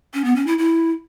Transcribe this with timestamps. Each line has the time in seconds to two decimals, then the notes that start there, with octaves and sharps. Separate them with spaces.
0.14 C#4
0.25 B3
0.36 C#4
0.47 E4
0.58 E4